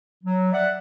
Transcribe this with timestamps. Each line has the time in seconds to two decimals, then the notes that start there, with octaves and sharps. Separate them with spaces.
0.24 F#3
0.53 D5 E5 F#5